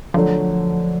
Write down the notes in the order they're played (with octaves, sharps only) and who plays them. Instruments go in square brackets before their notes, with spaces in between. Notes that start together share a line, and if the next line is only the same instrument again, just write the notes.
[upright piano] D3 F#3 A3 [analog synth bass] F3